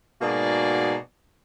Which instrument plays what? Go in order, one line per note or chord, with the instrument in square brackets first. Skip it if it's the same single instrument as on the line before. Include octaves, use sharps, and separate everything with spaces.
[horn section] G#2 B2 A#3 F#4 G#4 D5